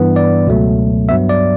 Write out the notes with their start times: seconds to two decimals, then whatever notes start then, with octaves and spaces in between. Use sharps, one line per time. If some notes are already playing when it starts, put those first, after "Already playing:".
Already playing: G2 E3 B3
0.16 D5
0.47 C#2 B2 F#3 A3
1.09 G2 F#3 B3 E5
1.29 D5